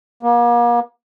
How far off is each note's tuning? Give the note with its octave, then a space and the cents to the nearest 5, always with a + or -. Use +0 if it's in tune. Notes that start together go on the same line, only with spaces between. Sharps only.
A#3 +40